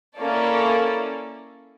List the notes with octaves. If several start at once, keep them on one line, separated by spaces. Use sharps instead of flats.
A#3 C#4 E4 A4 D5